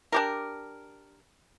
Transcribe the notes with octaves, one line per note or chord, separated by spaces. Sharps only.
D4 G4 A#4